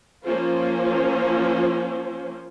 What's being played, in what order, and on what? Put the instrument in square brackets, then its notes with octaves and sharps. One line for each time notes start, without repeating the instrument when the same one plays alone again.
[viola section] F3 A#3 C#4 F4 C5